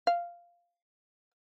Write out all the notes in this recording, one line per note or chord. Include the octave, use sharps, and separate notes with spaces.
F5